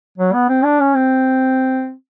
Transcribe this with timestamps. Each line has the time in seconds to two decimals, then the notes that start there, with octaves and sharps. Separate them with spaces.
0.18 F#3
0.33 B3
0.49 C4
0.64 D4
0.80 C#4
0.95 C4